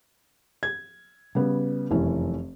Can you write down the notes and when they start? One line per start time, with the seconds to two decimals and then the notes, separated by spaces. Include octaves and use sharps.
0.63 G#6
1.35 C#3 G3 B3
1.91 F1 F#2 E3 C#4